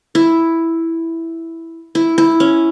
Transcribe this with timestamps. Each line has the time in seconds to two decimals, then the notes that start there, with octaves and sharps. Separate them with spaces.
0.15 E4
1.95 E4
2.18 E4
2.40 C#4